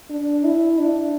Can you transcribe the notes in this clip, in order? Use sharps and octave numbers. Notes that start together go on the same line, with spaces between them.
D4
E4
D4